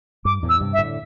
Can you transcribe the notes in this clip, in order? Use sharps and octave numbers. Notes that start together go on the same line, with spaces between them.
G2 D6
E2 A2
E6
G2 C3
E5
A2 D3